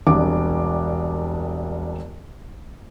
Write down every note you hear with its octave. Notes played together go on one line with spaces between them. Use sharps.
E1 C2 D4 D6